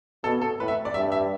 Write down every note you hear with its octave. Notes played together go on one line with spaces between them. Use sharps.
B2 A4
A4
A2 B4
E5
D5
G2 E5
E5